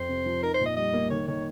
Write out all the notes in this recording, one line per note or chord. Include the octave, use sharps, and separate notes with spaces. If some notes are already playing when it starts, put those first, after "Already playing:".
Already playing: F2 C4 C5
C3
F3
D#4 A#4
C5
A#2
D#5
G3 D#5
A#3
D#3 C#5
D#3 C#5